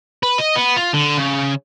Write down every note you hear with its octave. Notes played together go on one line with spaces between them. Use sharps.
B4
D#5
B3
F4
D3
C#3